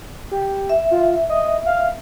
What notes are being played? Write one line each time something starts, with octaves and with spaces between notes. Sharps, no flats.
G4
E5
F4
D#5
F5